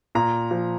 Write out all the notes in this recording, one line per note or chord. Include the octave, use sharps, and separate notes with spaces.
A#2 A#5
F3